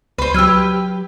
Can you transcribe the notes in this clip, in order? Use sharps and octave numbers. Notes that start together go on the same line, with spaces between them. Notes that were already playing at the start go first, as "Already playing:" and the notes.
C#2 B4 C5
F#3 G4 B4 E6 F6 G#6